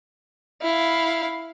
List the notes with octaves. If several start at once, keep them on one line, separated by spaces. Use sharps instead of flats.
E4 F5